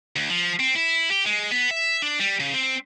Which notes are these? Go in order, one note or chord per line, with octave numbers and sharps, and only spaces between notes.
D2
F3
C4
E4
G4
G#3
B3
E5
D4
G3
C#3
C4